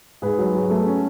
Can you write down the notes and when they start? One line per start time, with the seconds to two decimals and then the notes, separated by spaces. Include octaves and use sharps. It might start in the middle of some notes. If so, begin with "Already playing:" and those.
0.22 G#2 G#4 B4
0.38 F#3
0.55 F#3
0.70 A3
0.86 C#4